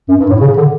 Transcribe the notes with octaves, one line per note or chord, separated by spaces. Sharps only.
F#2
G2
A2
C#3
D3